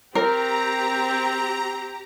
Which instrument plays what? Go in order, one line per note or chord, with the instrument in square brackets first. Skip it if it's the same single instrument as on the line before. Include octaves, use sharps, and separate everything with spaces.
[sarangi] C4 [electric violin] G4 [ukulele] A#4 [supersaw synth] A#5